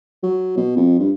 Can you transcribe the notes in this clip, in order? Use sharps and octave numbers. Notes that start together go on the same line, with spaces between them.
F#3
B2
F2
G2